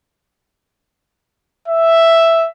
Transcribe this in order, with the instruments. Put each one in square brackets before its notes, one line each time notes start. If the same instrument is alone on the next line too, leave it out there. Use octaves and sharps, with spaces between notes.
[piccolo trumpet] E5